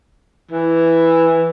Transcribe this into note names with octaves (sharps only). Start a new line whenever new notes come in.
E3